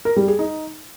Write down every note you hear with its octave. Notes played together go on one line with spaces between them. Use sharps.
A#4
G3
G#4
D#4